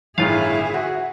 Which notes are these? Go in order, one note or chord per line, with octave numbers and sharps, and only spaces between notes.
G1 A2 D#3 F4 G#4 E5 F5
F#4